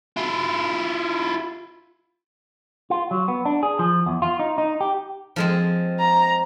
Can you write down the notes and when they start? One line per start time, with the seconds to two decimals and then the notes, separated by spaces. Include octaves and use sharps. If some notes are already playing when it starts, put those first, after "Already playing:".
0.17 E4 F4
2.90 F4
3.11 F#3
3.28 B3
3.45 D4
3.63 G#4
3.79 F3
4.06 E2
4.22 F4
4.39 D#4
4.58 D#4
4.81 G4
5.36 F3 G#3 C4
6.00 A#5